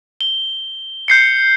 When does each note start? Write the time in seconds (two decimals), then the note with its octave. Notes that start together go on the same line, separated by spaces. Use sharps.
0.21 G7
1.08 G6 C7 C#7